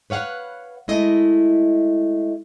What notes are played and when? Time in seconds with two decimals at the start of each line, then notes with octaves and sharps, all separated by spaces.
0.10 B4 C#5 F5 F#5
0.88 G#3 A3 E4 D#5